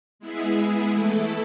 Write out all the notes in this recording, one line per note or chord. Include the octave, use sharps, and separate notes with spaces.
G#3 B3 E4 G#4
E3 A3 E4 A4